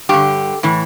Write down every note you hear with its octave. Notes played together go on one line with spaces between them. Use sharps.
G2 D3 G4
A2 E3